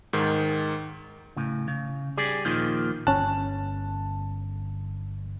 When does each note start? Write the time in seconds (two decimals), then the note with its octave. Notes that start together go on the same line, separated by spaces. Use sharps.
0.13 G#2 D#3
1.36 A2 C#3
1.68 C#3
2.18 G3 G#4 D5
2.45 D#2 A#2 D#3 F3
3.07 G1 C#4 A5 F#6